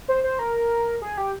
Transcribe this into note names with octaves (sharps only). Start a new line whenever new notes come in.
C5
C5
A#4
G#4
G4